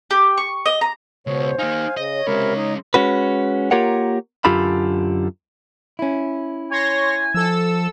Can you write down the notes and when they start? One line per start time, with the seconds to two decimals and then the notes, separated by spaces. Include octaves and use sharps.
0.11 G4
0.37 C#6
0.66 D#5
0.81 A#5
1.27 C#2 B2 C5 C#5
1.59 A#3 D#4 F5 G#5
1.97 C#3 D#5
2.13 C#5
2.27 C3 G#3 C#4 A#4 B5
2.57 D#4 D#5
2.94 G#3 C#4 F#4 B4
3.71 A#3 F4 G4 A#4 C#5 F#5
4.45 F#2 D3 F4 G4 A4 B5
5.99 C#4 E4
6.71 C#5 G#5 C6 A#6
7.34 F3 A4 E6